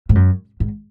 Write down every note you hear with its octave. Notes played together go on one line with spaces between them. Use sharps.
G#2
F#2
G#2